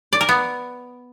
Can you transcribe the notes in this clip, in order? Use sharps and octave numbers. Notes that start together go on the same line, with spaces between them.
D5
A#4
B3